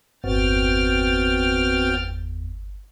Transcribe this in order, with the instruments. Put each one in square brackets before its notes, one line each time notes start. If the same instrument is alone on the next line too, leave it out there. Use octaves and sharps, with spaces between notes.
[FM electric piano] G1 [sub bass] E2 [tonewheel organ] B3 C4 F#4 [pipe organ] G5 F6 A6